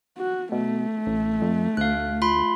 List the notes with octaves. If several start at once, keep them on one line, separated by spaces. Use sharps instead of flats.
F#4
B2 A3
A1
F2
D2 F5 F#6
F4 B5 C6